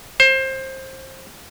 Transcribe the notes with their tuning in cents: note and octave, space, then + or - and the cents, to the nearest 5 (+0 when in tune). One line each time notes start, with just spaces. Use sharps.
C5 +20